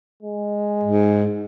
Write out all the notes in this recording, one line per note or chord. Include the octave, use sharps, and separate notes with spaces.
G#3
G#2